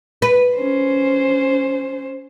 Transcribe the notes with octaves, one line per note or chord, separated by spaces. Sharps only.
B4
C#4 C5